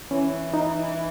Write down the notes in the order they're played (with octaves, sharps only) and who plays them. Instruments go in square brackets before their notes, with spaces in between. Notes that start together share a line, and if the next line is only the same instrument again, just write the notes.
[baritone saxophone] E3 [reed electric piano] C#4
[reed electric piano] D#4